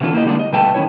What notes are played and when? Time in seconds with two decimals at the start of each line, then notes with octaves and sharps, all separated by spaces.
0.01 B2 D3 E3 C#4 F4 A4
0.13 A#3 E4 G4 D#5
0.25 D3 G3 G#3 A#3 D4 D#4
0.39 D#5
0.52 B2 G3 A3 B4 G5 A5
0.74 D#3 C#4 E4 C#5